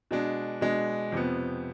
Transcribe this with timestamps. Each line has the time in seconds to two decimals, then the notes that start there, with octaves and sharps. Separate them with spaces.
0.11 B2 G#3 D4
0.61 B2 G#3 D4
1.12 F2 C3 F3 B3